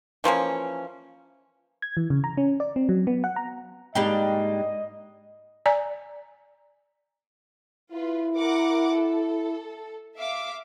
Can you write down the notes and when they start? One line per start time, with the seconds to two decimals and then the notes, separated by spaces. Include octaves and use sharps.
0.24 E3 F3 A#3 C#4
1.82 G#6
1.97 E3
2.10 C#3
2.24 A#5
2.37 C#4
2.60 D5
2.76 C4
2.89 F#3
3.07 B3
3.24 F#5
3.36 A#5
3.95 G#2 G3 A#3 D4 D#5 G5
5.66 D5 G#5 A#5
7.92 E4 F4 B4
8.35 A#4 F#5 D6
8.93 A4
10.17 E5 F5 D6